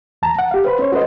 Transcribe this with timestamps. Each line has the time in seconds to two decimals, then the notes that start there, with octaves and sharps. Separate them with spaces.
0.22 E2 A5 A#5
0.39 F#5
0.51 G4 F5
0.65 B4 C5 B5
0.79 C#4 C5 C#5
0.92 F#4 A4 B4 C5 D#5